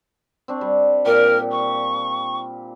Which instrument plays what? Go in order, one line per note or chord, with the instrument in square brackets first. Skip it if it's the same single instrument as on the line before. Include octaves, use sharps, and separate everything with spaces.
[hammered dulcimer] C4 D4 C#6
G3
[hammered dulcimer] A#2 G4 [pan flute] A#4
[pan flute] C#6